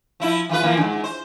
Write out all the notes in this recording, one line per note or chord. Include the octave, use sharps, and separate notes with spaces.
F3 E4
E3 F4 B4
E3 F3 A#3
G#2 D3
C5